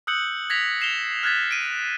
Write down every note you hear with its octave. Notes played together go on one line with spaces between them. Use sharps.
D#6 E6 F#6 G6 C#7 F#7
G#6 A#6 B6 F7
C7 E7 F7 G7
F6 F#6 G#6 A6 B6
D7 D#7